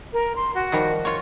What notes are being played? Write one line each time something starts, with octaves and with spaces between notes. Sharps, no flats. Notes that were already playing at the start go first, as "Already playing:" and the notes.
A#4
C6
F#4
D#3 F3 G3
F4 C#5 C#6